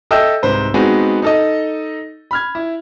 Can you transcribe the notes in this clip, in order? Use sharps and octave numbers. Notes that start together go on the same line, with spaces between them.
A4 D#5 E5 G5 E6 G6
C2 G#2 B4 C5 B5
G#3 B3 C4 D#4 F#4 G#4
D#4 A4 D#5
B5 F6 G#6
E4